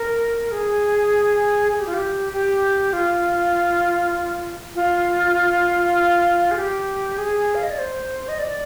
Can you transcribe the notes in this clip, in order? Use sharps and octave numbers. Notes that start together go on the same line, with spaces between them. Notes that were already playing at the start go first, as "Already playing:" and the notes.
Already playing: A#4
G#4
G#4
G4
F4
G4
G4
F4
F4
G#4
G4
G#4
F5
D#5
D5
C5
D#5
D5